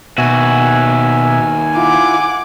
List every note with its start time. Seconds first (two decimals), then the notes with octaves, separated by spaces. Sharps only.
0.18 D#2 B2 F#4 E5 G#5
1.76 E4 F4 F#5 D6